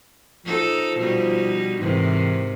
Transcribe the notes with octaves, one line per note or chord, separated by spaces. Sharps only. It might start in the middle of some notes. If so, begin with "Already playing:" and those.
F3 D#4 A4
B2 G3 D#4
G#2 C3 D#3 E3